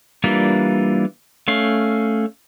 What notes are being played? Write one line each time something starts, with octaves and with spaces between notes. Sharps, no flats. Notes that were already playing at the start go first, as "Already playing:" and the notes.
E3 G3 A#3 D4 F4
A3 C#4 F5